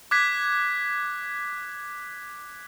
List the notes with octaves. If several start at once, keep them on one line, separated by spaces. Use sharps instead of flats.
D6 F#6 G#6 B6